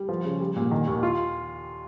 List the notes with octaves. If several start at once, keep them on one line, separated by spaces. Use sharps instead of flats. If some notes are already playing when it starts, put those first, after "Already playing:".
Already playing: G3
F3
C#3
G3
A#2
D#3
D#2
F4